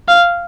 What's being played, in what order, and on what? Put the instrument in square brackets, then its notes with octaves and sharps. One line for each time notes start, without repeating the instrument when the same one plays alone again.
[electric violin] F5